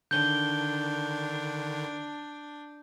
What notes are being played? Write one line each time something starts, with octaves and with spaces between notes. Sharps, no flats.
D3 D#3 D4 G6 G7